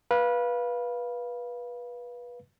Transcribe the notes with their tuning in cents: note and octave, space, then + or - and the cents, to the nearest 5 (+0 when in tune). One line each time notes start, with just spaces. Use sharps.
B4 -20 F5 +0